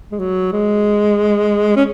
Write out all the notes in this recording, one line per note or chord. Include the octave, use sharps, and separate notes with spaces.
G#3
F#3
G#3
C#4